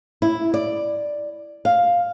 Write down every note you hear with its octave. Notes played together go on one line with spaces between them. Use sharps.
E4
D5
F5